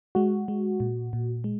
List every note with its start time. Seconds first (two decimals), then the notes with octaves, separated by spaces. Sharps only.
0.15 G#3 F#4
0.48 G#3
0.80 A#2
1.13 A#2
1.44 G#3